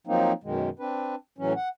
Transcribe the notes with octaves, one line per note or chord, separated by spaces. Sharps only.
F3 F#3 A#3 C4 D#4
F#2 B2 D#3 G#3
C4 D4 B4
A2 E3 F#3 C#4
F#5